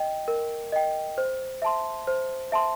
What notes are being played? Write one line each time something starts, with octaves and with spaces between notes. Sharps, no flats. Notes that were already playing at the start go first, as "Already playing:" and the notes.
Already playing: D#5 G5
A#4
D#5 G5
C5
E5 A5 C6
C5
E5 A5 C6